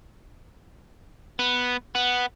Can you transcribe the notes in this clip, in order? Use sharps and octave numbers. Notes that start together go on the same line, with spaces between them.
B3
B3